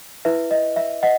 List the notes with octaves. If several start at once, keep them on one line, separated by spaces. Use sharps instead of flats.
E4 B4 E5
D#5
E5
D#5 F#5